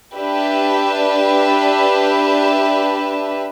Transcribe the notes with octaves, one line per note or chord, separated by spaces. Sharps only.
D4 G4 B4 E5